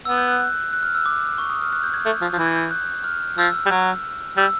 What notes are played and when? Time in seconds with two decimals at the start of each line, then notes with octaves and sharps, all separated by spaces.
0.05 B3 E6
0.18 G6
0.28 F#6
0.39 F#6
0.73 F#6
0.83 F6
0.95 E6
1.06 D6
1.38 C#6
1.50 D#6
1.62 F6
1.73 F#6
1.83 G6
1.94 G#6
2.05 A3 G6
2.22 F3
2.33 F3
2.38 E3 G6
2.47 G#6
2.56 G6
2.71 F#6
3.04 F6
3.38 F3 E6
3.66 G3
3.71 F#3
4.37 G3 E6